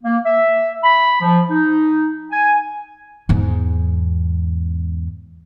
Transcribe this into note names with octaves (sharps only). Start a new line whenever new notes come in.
A#3
E5
B5
F3
D#4
G#5
E2 G#2